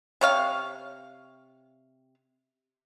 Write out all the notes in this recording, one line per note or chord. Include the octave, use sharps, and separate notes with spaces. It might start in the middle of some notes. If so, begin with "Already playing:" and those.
C3 C#5 F5